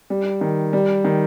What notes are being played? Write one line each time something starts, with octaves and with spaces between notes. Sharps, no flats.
G3
D#3
G3
D#3